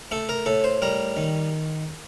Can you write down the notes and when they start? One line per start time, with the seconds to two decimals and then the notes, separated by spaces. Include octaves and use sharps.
0.11 A3 A4
0.29 A#4
0.46 A2 A4
0.64 C5
0.82 G3 A#4
1.17 D#3